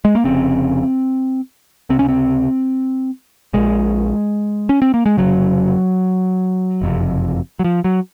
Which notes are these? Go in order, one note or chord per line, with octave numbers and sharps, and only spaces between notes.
G#3
A#3
F1 F2 C#3 C4
C#2 C3 C4
C#4
C4
A#1 A#2 G#3
C#4
C4
A#3
G#3
F1 F2 C#3 F#3
F#1 F2 C3
F#3
F3
F#3